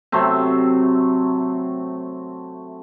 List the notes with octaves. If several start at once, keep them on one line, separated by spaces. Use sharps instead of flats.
C3 F#3 A3 C4